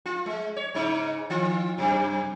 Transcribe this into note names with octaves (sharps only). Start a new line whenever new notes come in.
F4
G#3
C#5
G#2 C#3 D#4
D#3 F4
F#2 C3